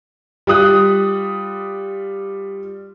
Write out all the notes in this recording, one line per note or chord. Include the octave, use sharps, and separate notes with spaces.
G3 F4 D#6 F#6